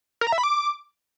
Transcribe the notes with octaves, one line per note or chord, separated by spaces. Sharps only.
A#4
A#5
E5
B5
D6